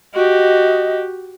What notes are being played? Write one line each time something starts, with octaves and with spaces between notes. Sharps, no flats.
F#4 G4 D#5